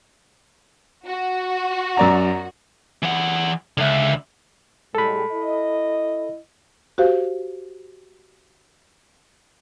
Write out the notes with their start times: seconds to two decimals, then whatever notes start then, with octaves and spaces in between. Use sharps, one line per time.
1.06 F#4
1.97 F#2 D5 A#5
3.03 E3 F#5
3.78 C#2 D3 E5
4.95 A2 G3 G#3 A4 B5
5.32 E4 D#5
6.98 F#4 G4 C5 F5